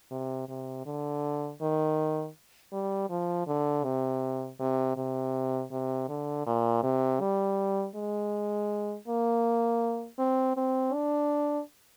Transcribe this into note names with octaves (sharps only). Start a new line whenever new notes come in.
C3
C3
D3
D#3
G3
F3
D3
C3
C3
C3
C3
D3
A#2
C3
G3
G#3
A#3
C4
C4
D4